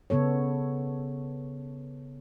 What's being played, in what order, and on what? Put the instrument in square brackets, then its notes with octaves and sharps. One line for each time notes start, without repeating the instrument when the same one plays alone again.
[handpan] C#3 B3 A4 C#5